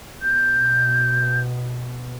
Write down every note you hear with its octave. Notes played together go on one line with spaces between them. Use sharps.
B2 G6